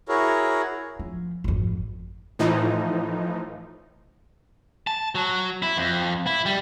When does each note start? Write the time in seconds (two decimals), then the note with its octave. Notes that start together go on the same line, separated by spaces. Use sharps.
0.09 E4 F#4 G#4 A#4 C#5
1.00 F3
1.44 G#1 F2
2.39 A2 E3 F3 D#4
4.87 A5
5.15 F#3
5.62 E4
5.78 F2
6.27 E4
6.46 G3